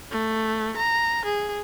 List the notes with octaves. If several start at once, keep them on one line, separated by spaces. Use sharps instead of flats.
A3
A#5
G#4